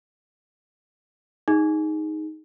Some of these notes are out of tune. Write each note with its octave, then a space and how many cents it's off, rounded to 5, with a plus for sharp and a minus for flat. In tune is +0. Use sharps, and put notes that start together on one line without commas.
D#4 +5 G#4 +0